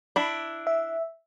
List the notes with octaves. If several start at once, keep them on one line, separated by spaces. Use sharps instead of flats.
D4 E4
E5